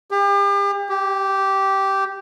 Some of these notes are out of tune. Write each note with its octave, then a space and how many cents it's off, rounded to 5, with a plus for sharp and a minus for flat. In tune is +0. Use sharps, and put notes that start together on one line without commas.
G4 +40
G4 -10